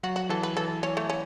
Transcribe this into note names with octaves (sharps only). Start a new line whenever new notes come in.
F#3 F#4
F#4
E3 A4
B4
E3 A4
C#4
A3
C#4